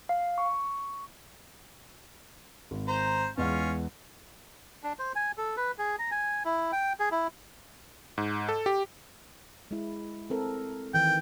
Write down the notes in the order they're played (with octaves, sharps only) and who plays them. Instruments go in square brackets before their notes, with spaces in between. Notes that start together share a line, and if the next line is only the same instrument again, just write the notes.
[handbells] F5
C#6
[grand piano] G#1
[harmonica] C5 A#5
[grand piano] E2 G#3 F#5 [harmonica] C#4 F4
[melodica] D4
C5
G#5
A4
B4
G#4
A#5
G#5
E4
G5
G#4
E4
[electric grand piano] G#2
A4
G4
[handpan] G#3 E4
C4 A4 A#4
[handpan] D#3 E3 [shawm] G5